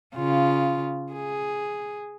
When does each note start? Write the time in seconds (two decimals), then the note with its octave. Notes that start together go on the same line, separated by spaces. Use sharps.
0.16 C#3 F4
1.13 G#4